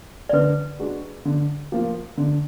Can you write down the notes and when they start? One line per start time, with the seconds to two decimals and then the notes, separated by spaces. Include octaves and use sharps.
0.29 D5
0.33 D3 B4
0.79 G#3 D4 F#4
1.25 D3
1.72 F3 A#3
2.18 D3